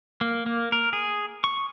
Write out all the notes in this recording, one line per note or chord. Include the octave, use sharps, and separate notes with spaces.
A#3
A#3
A#4
G#4
C#6